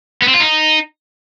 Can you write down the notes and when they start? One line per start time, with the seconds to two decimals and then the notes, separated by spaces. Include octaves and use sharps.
0.22 B3
0.28 C4
0.34 F4
0.40 D#4